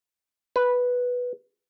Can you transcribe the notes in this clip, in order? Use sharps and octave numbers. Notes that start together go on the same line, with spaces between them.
B4